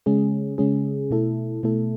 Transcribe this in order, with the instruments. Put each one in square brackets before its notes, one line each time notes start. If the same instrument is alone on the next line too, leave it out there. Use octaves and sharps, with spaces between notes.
[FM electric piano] C#3 G#3 C#4 G#4
C#3 G#3 C#4 G#4
B2 A3 E4 A4
B2 A3 E4 A4